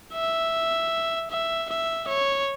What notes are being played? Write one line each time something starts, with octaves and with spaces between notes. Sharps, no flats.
E5
E5
E5
C#5